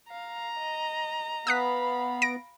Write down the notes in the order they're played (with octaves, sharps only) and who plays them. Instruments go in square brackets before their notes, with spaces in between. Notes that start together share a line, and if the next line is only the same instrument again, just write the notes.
[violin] F5 [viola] A#5
[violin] D#5
[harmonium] B3 [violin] F5 B5 [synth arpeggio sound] D#6 F#6 B6
[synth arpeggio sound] A#6 D7